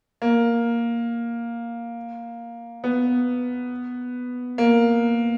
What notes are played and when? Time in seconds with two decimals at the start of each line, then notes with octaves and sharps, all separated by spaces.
0.22 A#3
2.84 B3
4.58 A#3